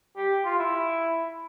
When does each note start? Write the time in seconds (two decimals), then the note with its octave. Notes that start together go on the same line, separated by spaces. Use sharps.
0.17 G4
0.45 F4
0.59 E4